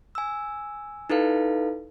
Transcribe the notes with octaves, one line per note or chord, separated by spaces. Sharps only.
G#5 E6
D#4 E4 A4 B4 F5